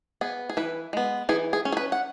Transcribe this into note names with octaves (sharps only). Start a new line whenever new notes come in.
B3 G#4
G#4
E3 B4
G#3 B3
E3 G#4
G#4
C#4
G#4
B4
F#5